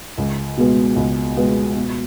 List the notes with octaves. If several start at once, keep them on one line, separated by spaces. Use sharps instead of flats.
C#2
B2 G#3 B3
C#2
B2 G#3 B3
B2